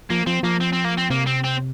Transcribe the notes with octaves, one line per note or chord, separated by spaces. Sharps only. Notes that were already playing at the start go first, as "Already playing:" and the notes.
F3 A#3
F3 C4
F3 A#3
C4
C4
A#3
C4
C3 A#3
C4
C4